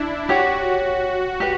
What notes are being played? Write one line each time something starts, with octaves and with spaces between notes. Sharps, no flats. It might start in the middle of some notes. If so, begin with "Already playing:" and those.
Already playing: D4 E4
F#4 G4 C#5 F#5
G4 B4